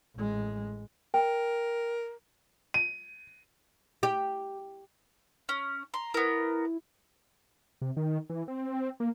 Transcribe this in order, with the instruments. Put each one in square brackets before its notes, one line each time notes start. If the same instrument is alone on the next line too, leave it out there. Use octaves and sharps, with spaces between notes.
[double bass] A1 G#3
[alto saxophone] A#4 [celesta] G5
[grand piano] D#7
[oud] G4
[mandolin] C#4
[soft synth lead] A#5 [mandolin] C6
[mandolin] B3 A#4 [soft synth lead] E4
[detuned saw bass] C3
D#3
E3
C4
A#3